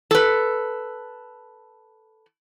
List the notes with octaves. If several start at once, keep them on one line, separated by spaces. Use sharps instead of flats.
A4 B4